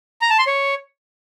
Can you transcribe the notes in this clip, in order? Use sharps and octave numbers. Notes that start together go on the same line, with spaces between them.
A#5
A5
C6
C#5